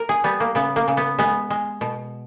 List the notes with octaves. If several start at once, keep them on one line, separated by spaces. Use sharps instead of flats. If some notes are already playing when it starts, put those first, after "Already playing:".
Already playing: A#4
G#4
G3 B3
A#3
C#3 B3
A#3
C#3
B3
G#3 B3
G#3
B2